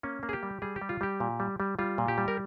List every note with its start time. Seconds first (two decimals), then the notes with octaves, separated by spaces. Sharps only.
0.03 A#3 C#4
0.23 A#3
0.29 G#4
0.33 G4
0.43 G3
0.62 G3 G#4
0.76 G4
0.82 G3
0.89 F4
1.01 G3 G4
1.20 A#2
1.40 G3
1.60 G3
1.79 G3 F4
1.98 A#2
2.08 G4
2.18 G3
2.28 A#4